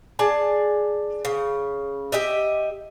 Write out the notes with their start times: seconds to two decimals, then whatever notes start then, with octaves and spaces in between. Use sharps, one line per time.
0.19 D4 G#4 A5
1.25 C#3
2.12 G4 D#5 E5